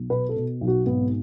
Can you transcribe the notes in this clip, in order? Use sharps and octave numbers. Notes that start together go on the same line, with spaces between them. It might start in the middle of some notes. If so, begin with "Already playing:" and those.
Already playing: B1
B2 B4
A4
B2
B1
F#4
G#1 B3